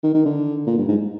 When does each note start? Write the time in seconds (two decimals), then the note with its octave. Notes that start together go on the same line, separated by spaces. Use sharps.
0.04 D#3
0.14 D#3
0.25 D3
0.67 A#2
0.78 G2
0.88 G#2